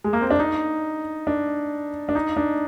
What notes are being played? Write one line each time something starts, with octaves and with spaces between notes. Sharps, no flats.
G#3
A#3
C4
D4
D#4
D4
D4
D#4
D4